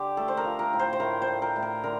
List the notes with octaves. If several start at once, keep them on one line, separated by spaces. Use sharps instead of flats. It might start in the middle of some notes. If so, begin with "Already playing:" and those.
Already playing: D3 G4
A3 A4
C5
A#4
F3
A#4
A2
C5
C5
A2 A#4
C5
A3
A#4
A2
A#4
D3 A#4